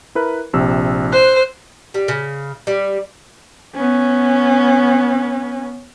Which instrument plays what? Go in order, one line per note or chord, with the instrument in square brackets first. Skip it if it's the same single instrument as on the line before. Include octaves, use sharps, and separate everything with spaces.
[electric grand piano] E4 A#4 B4
A#1 C3 E6
[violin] C5 [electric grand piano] F#6
[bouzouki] G3
C#3
G3
[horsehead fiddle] B3 C#4